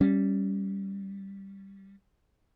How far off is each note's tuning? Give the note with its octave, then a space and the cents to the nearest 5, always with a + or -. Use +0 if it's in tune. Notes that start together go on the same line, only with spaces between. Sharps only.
G3 +0 C#4 +0